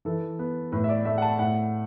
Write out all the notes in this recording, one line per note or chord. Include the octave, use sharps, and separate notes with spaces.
E3 A4
B3
A2 B4
E5
D5
A3 E5
F#5
A5
A2 F#5